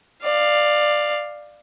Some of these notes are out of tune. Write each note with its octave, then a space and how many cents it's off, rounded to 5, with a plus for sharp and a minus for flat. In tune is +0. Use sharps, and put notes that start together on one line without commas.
D5 +15 F5 +0